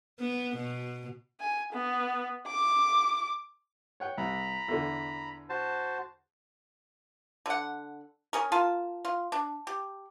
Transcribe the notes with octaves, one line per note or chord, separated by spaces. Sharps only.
B3
B2
G#5
B3
D6
C#5 F#5 G5
C2 A#5 B5
E2 D3
F#4 C5 A5
D3 F#5
C#4 G#4 A#4
F4 A#4 A5
F4
D4
G4